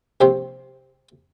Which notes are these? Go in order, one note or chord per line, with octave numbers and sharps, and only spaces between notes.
A#1 C3 G3 C4 C5